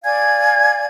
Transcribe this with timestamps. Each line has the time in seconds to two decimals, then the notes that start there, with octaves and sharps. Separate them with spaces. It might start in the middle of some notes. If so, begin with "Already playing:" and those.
0.04 D5 F5 G#5 G#6